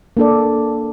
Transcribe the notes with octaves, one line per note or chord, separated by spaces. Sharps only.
A#3 D4 A4 D5